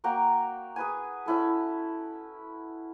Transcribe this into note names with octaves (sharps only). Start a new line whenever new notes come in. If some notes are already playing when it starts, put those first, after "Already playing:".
A#3 F#4 G5 A#5
G#4 B4 G#5
C#4 E4 A4